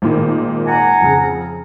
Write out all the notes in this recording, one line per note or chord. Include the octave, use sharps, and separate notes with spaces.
G#1 A#2 D#3
F#5 G#5 A#5
F2 C#3